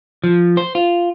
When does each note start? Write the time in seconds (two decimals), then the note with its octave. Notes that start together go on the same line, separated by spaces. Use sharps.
0.24 F3
0.57 C5
0.75 F4